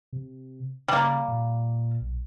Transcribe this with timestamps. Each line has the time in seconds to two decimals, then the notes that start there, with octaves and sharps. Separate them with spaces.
0.13 C3
0.88 C#3 G3 A#3
1.28 A#2
2.01 B1